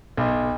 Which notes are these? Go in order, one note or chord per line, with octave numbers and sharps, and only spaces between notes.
B1